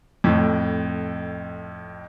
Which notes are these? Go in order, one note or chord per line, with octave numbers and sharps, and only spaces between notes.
F2 A2